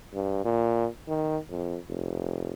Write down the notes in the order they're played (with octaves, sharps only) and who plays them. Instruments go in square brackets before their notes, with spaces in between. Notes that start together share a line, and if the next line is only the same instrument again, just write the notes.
[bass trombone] G2
A#2
D#3
F2
F1